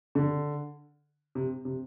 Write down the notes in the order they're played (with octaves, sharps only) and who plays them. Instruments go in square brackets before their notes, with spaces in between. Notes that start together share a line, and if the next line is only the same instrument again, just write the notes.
[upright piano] D3
C3
C3